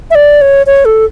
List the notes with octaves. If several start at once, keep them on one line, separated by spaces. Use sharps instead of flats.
E5
D5
C#5
C#5
A4